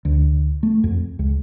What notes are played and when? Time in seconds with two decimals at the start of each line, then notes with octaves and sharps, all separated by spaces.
0.05 D2
0.63 A3
0.84 F2
1.19 C#2